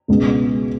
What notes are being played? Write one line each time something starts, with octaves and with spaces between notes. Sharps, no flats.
C#2 B2 G#3 B3